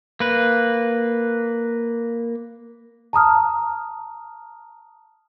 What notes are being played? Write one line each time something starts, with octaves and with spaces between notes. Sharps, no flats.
A#3 B4
A5 A#5 D#6 F6